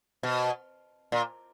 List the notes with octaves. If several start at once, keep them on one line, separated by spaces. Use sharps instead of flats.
B2
A#2